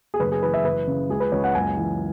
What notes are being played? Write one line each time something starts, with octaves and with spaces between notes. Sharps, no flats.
G#4
F#1 B4
G#4
E3 B4
E5
F#1 B4
C#3
C#2 G#4
B4
C#2 C#5
F#5
F#1 G#5
E3